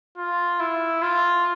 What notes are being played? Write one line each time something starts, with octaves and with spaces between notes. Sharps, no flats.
F4
E4
F4